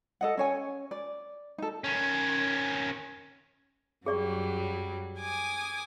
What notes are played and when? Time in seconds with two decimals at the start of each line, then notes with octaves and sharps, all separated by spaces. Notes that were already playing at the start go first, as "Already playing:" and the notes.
0.21 A4 D#5 F#5
0.37 C#4 C#5 G#5
0.91 D5
1.58 D#4 A4
1.84 D#3 C#4
4.06 F#2 F#3 G3 G#4 D5 C#6
5.20 G#5 D6 D#6